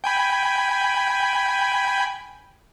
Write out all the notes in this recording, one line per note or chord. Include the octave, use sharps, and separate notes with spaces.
G5 G#5 B5